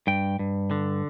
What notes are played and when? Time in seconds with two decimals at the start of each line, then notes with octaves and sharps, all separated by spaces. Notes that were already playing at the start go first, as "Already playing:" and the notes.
0.07 G2 G5
0.39 G2
0.71 D3